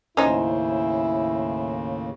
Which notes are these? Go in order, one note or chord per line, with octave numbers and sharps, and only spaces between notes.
D#2 A2 C#3 C#4 D#4 E4 C5 G#5